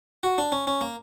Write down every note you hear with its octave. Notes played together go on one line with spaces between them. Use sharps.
F#4
D4
C#4
C#4
A#3